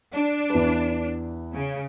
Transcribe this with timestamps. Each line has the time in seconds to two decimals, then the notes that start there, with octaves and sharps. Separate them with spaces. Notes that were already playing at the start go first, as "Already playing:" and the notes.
0.15 D4
0.50 E2 B4
1.53 C#3